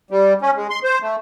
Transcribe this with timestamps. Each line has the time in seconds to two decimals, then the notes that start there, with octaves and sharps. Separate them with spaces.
0.11 G3
0.42 C#4
0.55 G#3
0.70 C6
0.84 C5
1.02 A3